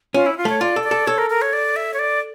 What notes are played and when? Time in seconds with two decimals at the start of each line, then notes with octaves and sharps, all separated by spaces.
0.14 C#4 F4
0.26 E4
0.38 F4
0.45 A3 C#5
0.60 F4 D5
0.76 A4
0.84 D5
0.91 A4
1.07 A4 C#5
1.18 A#4
1.30 A#4
1.42 C#5
1.53 D5
1.76 E5
1.94 C#5
1.99 D5